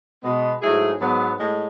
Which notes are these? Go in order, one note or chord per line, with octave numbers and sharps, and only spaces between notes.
B2 G#3 B3
G#2 F#3 A3 E4 G#4
G#2 F#3 B3
A2 G#3